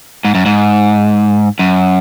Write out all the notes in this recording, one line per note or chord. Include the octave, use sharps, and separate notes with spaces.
G#2
F#2
G#2
F#2